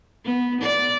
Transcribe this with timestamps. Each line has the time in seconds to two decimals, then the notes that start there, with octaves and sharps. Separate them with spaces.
0.25 B3
0.61 D5